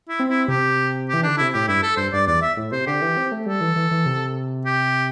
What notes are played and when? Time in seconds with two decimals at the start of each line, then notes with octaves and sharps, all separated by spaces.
0.09 E4
0.20 C4
0.29 E4
0.48 C3 G4
1.09 E3 G4
1.23 D3 D4
1.38 C3 E4
1.54 A2 G4
1.68 G2 E4
1.83 A4
1.97 G2 C5
2.13 G2 D5
2.27 E2 D5
2.42 E5
2.57 A2
2.72 C3 C5
2.87 D3 G4
3.02 E3
3.17 C4
3.32 A3
3.46 G3 A4
3.61 E3
3.76 E3
3.91 E3
4.06 C3
4.66 G4